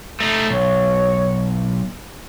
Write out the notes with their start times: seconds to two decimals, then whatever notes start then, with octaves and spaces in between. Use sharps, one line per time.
0.20 A3 D#4
0.51 B1 C#5